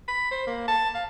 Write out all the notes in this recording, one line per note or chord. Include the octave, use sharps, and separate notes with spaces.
B5
C5
A#3
A5
F5